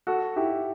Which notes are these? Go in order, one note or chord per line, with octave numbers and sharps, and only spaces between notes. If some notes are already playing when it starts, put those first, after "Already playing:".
F#4 A4
E4 G4